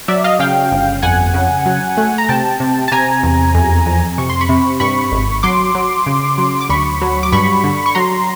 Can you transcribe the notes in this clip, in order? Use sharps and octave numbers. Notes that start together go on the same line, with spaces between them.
F#3 D5 E5
D#5 F5
C#3 F5 G5
G1
F2 F#5 G#5
C#3
F#3
A3
A#5
C3 G5 A5
C3
A5
C3 G#5 A#5
E2
F2
F2
C3 C#6
C6
B5 C#6
C3
G2 B5 C#6
G#1
F#3 C6 D6
F#3
C#3
F#3
D6
D2 B5 C#6
F#3
D6
G2 B5 C#6
D3
C#6
F#3 A#5 C6